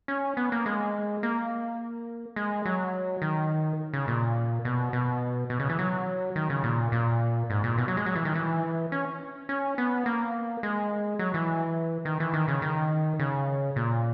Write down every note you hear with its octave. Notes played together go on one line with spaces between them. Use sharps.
C#4
B3
A#3
G#3
A#3
G#3
F#3
D#3
C#3
A#2
B2
B2
B2
C#3
E3
F#3
D#3
C#3
A#2
A#2
G#2
A#2
B2
F#3
G#3
F#3
E3
D#3
E3
C#4
C#4
B3
A#3
G#3
F#3
E3
D#3
E3
D#3
C#3
D#3
C#3
A#2